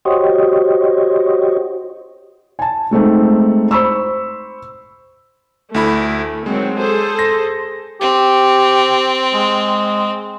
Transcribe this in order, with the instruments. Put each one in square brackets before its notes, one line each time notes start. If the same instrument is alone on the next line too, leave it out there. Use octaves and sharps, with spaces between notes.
[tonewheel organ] F#4 G4 C5 C#5 D#5
[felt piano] G#5 A5
G#3 A3 C4 D#4
C5 B5 C#6 E6
[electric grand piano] D2 E4 B5 [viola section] A3
[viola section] D#3 F#3 C4 [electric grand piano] G#3
[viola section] G#4 A4 C5
[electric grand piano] A#6
[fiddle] C4 [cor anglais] G4
[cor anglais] G#3